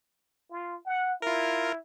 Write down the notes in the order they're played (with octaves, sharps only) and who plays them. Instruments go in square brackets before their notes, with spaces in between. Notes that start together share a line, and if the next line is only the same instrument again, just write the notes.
[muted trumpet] F4
F#5
[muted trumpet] E4 [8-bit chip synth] F4 A#4